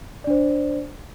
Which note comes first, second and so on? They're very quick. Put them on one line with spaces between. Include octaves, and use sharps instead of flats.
D5 D4 C5